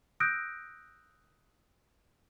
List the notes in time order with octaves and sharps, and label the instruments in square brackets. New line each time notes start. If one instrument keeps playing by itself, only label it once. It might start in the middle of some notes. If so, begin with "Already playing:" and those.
[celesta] D#6 E6 F#6 G6 A#6 D7